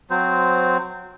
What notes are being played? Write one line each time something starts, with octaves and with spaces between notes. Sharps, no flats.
F#3 C4 C5